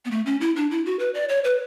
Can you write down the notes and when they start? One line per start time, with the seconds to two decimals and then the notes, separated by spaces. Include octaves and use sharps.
0.05 B3
0.11 A3
0.26 C#4
0.41 E4
0.56 D4
0.71 E4
0.86 F#4
0.99 B4
1.15 D5
1.29 C#5
1.44 B4